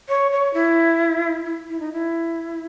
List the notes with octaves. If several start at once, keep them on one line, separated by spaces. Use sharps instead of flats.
C#5
C#5
E4
E4
E4
D#4
E4